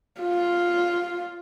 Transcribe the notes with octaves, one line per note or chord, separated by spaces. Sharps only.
F4